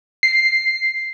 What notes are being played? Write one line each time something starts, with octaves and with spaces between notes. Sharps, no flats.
C7